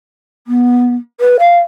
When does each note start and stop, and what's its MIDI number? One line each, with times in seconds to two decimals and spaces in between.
0.47 0.94 59
1.20 1.36 71
1.39 1.57 77